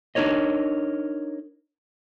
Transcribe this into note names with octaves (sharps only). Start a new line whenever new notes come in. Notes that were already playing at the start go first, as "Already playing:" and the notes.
D4 D#4 A#4 C#5 D#5